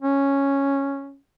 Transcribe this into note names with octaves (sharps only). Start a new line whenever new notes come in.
C#4